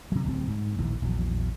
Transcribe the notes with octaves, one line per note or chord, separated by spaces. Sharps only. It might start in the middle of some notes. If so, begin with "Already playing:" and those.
C3 F#3
D1 C2 G3 C4
G#2
A#1 D#2 A2 E3
A#1 E2 F#3